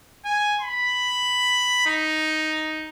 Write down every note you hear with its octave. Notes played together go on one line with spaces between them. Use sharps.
G#5
B5
D#4